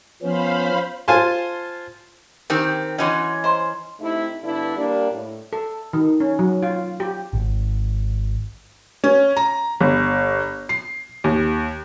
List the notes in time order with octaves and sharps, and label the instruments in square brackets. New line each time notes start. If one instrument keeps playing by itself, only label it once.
[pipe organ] F3 B3 C#4 [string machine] C5 F5 B5
[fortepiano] F4 C5 F5 G#5 A5 C6
[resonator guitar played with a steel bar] D#3 C4 [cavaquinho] G4
[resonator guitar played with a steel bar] E3 C#4 [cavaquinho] F#4 C6 [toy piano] C#5 D#5 G#5
[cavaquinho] C5 [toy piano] D#5 A#5 C6
[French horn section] C3 A3 D#4 E4
G2 D3 B3 D4 E4
G3 A#3 D4
A2
[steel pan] A4
D#3
C#4
F#3
F4
G4
[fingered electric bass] G#1
[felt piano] C#4
A#5
G1
C7
D#2